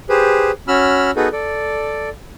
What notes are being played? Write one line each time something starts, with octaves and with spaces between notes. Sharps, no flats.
G4 G#4 B4 C5
C#4 F#4 B5 E6 F6
B3 D#4 F#4 G#4 A4 B4
A4 D5